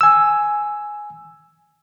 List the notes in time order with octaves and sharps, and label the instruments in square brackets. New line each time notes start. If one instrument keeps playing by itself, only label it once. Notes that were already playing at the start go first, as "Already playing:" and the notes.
[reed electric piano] G#5 E6